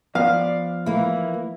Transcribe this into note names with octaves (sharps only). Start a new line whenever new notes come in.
F3 B3 D5 F5
E3 A#3 E4